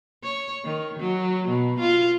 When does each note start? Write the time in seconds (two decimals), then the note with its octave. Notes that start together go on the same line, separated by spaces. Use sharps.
0.23 C#5
0.64 D#3
0.99 F#3
1.48 B2
1.79 F4